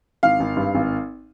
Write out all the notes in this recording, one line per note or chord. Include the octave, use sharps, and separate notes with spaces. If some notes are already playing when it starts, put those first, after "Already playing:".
G#1 F5
G#1
G2
G#1